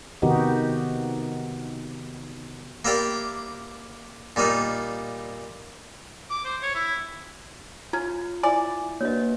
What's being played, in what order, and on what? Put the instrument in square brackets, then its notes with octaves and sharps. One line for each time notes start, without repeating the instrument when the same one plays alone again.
[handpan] C3 D#3 B3 D#4 F#4 G4
[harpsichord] A#3 E4 G4 D5 G5
A#2 G3 A#3 D#4
[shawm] D6
C5
C#5
E4
[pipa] C#4 [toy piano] E4 [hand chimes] F4
[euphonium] E4 [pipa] D5 [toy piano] G#5
[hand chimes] A#3 F#4 B4 [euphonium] D4 [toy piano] C#5 D#5